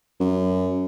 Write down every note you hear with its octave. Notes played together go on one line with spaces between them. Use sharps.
F#2